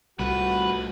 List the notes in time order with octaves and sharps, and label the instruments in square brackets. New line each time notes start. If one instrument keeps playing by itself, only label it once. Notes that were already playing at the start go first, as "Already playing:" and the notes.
[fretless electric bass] C2 [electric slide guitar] G3 A3 F4 [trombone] F#4 [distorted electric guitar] B4